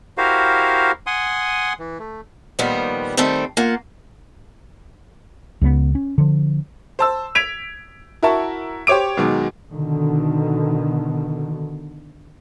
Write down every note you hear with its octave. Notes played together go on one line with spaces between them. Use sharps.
E4 F#4 G4 A#4 C5 F5
F#5 G#5 C6 D#6
E3
A3
A#2 D#3 F3 G3 B3
D#3 G3 A3 C4 A4
A#3 F4 F#5
C#2 C#3 F#3 B3
C#4
D3 F3
C5 A5 E6
G#6 B6 D7 F7
E4 F#4 A#4 E5 A5 C#6
G4 C5 C#5 D6 D7
B2 D#3 F#3 G#3
B2 D3 D#3